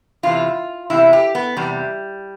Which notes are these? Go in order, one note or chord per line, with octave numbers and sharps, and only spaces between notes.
E2 C3 E3 F4
E2 C3 E3 E4
G4
B3
E2 C3 E3 G3